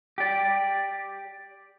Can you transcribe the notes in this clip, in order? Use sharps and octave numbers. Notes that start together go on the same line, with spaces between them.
G4 D5